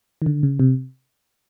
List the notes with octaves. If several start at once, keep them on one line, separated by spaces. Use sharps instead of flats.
D#3
D3
C#3
C3